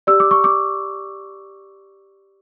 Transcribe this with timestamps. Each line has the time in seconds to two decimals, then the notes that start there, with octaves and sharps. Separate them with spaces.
0.07 G4 D5 E6
0.20 D6
0.31 C#6
0.44 D6